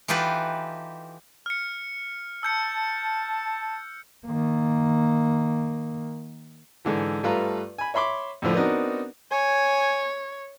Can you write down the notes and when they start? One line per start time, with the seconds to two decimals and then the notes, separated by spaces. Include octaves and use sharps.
0.08 E3 D#4 F4 G4 A4 B4
1.46 F6 C#7
2.43 A5 E6 G6 C#7
4.26 D#3 A#3
6.85 G#2 D3 E3
7.23 G2 A3 F4 B4 F5 A#5
7.78 G#5 B5
7.94 C#5 E5 B5 C6 D6
8.42 F2 A2 D3 F3
8.54 B3 C4 D4 D#4 F#4 A#4
9.32 C#5 G#5